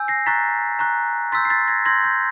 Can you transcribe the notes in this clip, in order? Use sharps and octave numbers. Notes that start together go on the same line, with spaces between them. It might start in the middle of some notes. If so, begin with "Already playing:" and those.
Already playing: G#5 E6 G6
A#6 C7
A#5 C#6 F#6 A6 B6
A#5 C#6 F#6
C6 E6 G6 A6 B6
C7
A6 B6
G#6 A#6
C6 E6 G6 G#6 A#6
G6 A6